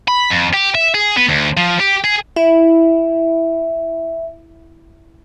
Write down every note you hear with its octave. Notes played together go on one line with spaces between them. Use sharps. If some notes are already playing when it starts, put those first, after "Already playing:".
B5
F2
G4
E5
G#4
B3
D2
F3
G4
G#4
E4 E5